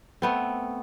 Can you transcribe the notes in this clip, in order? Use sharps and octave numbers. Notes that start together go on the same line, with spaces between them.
A3 B3 C4